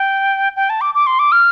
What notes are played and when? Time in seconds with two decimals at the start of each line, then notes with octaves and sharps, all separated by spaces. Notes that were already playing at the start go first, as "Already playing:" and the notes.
Already playing: G5
0.56 G5
0.70 A5
0.81 D6
0.95 D6
1.07 C6
1.19 D6
1.32 F6